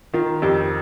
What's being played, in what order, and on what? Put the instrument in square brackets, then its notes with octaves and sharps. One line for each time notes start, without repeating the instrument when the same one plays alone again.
[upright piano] D#3 [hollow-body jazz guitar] F4
[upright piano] F2 [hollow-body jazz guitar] G4